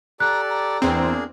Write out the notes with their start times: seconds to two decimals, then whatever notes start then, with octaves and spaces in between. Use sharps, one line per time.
0.20 G4 A4 D5 A#5 F#6
0.50 A#5
0.82 E2 A#3 C4 D4 G#4